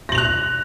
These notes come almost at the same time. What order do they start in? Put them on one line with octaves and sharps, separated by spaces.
A#6 F#7 F7 F#6